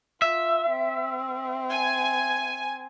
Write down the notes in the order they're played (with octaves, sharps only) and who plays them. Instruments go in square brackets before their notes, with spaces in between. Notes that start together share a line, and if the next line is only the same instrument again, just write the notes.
[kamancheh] F4 [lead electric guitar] E5
[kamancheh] C4
[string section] G#5